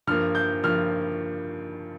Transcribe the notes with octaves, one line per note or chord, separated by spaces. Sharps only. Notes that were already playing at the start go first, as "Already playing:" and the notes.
G2 F3 A#3 F6
G6
G2 F3 A#3 F6